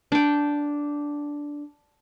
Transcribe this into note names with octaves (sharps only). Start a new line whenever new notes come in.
D4 G5